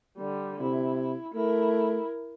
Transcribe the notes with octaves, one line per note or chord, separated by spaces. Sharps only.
D3 G3
C3 E4
A3 E4 A#4